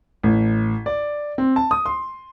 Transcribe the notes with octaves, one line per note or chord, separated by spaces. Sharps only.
A1
D5
C4
A5
D#6
C6